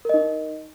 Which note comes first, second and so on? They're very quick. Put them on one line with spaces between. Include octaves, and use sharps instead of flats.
A#4 D#5 D#4